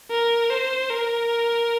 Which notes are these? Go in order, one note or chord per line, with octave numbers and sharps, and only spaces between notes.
A#4
C5
A#4